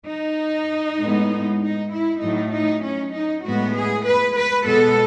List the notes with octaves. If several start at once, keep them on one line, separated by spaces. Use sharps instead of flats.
D#4
A2 G#3 B3
D#4
E4
A2 F#3 A3 D#4
D#4
C#4
D#4
A2 G#3 B3 F#4
G#4
B4
B4
B2 G#3 B3 A4